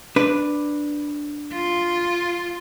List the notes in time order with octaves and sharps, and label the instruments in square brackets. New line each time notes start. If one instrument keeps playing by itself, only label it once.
[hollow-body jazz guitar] D4 B4
[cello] F4